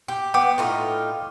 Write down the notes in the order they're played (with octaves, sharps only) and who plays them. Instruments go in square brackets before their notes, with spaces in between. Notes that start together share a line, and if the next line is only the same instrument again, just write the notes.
[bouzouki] G4
[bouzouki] B3 [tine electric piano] G5 D6
[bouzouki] A2 D#4 F4